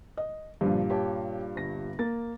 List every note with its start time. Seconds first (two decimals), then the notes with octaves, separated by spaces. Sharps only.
0.17 D#5
0.61 G2 A#2 D3 F3
0.90 G4 C#5 A5
1.55 G1 A#6
1.99 A#3 A6